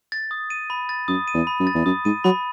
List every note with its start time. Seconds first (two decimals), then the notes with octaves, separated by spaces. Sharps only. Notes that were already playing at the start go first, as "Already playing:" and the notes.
0.12 A6
0.31 D#6
0.50 D#7
0.70 B5
0.89 A6
1.08 F#2 D#6
1.28 D#7
1.34 E2
1.47 B5
1.60 F#2
1.67 A6
1.74 E2
1.86 F#2 D#6
2.05 G#2 D#7
2.24 F#3 B5